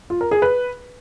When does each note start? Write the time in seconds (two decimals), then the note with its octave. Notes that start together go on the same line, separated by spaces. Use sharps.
0.10 F4
0.21 A#4
0.31 G#4
0.42 B4